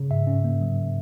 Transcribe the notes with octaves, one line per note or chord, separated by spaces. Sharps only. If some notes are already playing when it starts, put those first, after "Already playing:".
Already playing: C#3
G#2 E5
C#4
A#3
F#3